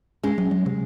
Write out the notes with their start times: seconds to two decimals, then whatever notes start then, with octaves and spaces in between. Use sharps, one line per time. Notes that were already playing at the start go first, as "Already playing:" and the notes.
0.23 G#3 C#4
0.38 F#3
0.51 F#3
0.66 C3